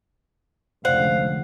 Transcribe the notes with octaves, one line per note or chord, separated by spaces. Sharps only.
F1 C#2 D3 C5 F5 F#5